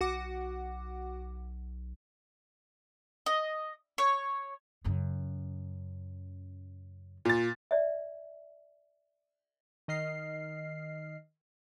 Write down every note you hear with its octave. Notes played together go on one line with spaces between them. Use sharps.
B1 F#4 F#5 D6
D#5
C#5
F#2 C#3
A#2 A6
D5 E5
D#3 D#5 F6 C7